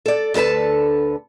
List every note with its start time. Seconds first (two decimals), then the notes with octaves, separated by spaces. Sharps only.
0.06 A4 D5
0.34 D2 D3 A4 B4 A5